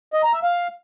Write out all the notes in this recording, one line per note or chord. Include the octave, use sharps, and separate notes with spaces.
D#5
A#5
E5
F5